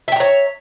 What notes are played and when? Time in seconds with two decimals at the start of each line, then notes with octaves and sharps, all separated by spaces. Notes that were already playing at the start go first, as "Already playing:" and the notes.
0.08 E5
0.12 G5
0.16 A#5
0.20 C#5